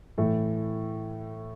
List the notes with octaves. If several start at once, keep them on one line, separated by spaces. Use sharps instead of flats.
A2 E3 A3 E4